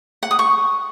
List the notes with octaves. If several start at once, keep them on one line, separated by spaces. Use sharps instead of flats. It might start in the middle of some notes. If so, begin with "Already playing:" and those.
F#5
D#6
C#6